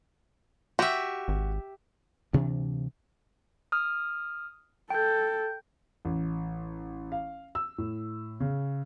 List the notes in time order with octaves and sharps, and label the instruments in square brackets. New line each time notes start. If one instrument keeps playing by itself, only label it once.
[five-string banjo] F#4 [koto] G4 E5
[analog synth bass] G#1
[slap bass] D2 C3 E3 D4
[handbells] D#6 F6
[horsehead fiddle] A4 [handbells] G5 G6
[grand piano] A1
F5
E6
A2
C#3